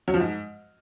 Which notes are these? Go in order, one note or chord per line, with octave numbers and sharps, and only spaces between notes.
F#3
F3
G#2